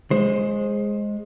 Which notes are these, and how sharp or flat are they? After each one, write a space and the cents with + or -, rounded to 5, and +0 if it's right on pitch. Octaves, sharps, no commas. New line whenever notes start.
G#3 +0 C5 +20